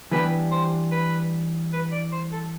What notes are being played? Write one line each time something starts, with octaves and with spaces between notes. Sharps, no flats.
E3 G3 B3 D4 G4 B4
C5
B4
B4
D5
C5
A4